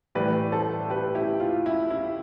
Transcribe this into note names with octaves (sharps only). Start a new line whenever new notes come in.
A2 E3 G3 B4 D5
A4 C5
G4 B4
E4 G4
F4
E4
E4